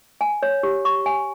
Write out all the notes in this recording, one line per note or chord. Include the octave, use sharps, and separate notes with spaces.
G#5
C#5
G4
C#6
G#5